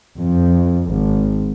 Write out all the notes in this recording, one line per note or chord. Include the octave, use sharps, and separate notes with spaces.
F2
G#1